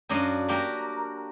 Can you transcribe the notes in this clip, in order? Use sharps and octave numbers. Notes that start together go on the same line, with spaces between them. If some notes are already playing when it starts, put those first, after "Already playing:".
F#2 D4 F#4 D#5 F5
A#3 F#4 G4 A#4